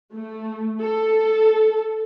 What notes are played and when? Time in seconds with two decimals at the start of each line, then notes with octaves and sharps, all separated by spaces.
0.14 A3
0.82 A4